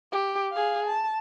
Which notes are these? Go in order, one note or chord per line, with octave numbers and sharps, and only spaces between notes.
G4
G#4 F5
A5